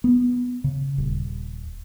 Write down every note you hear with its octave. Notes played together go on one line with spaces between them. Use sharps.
B3
C#3
D#1